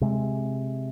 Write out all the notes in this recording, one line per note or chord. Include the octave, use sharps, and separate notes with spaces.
C3 G#3